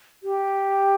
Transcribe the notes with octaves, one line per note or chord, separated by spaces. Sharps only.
G4